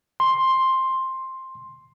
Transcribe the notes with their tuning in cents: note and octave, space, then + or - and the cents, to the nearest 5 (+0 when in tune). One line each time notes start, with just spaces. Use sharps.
C6 +10